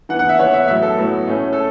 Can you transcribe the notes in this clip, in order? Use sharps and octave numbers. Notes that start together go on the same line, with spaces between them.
E3 B3 F#5
F#5
E5
E3 B3 C#5
E5
A2 F#3 B3 E5
A4
A2 F#3 B3
A2 A3 C#4
A4